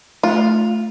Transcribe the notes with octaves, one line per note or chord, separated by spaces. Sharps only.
A3 F4